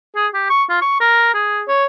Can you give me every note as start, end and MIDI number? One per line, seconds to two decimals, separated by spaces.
0.16 0.27 68
0.34 0.48 67
0.50 0.64 85
0.69 0.78 65
0.81 0.97 85
1.00 1.33 70
1.34 1.62 68
1.68 1.86 73